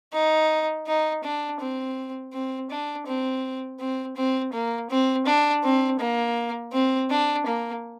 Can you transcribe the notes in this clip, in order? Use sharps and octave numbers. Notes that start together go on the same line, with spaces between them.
D#4
D#4
D4
C4
C4
D4
C4
C4
C4
A#3
C4
D4
C4
A#3
C4
D4
A#3